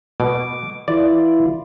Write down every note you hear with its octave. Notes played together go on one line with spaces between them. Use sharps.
B2 D6
E3 E4 F4 D5